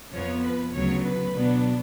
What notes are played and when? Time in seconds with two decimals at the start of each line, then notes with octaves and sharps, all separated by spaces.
0.11 F2 F3 B3 C#5
0.42 B4
0.73 D2 C#3 F#3 B3 C#5
1.04 B4
1.34 B2 F#3 B3 D4